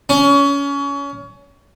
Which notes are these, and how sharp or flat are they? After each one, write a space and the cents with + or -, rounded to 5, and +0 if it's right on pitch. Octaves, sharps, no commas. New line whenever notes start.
C#4 +25